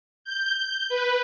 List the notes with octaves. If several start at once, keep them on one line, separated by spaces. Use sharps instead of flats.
G6
B4